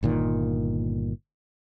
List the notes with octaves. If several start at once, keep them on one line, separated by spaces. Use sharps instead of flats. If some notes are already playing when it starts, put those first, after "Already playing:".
G1 A#2 D#3